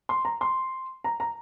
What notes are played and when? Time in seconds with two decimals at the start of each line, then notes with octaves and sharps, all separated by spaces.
0.09 C6
0.25 A#5
0.41 C6
1.04 A#5
1.20 A#5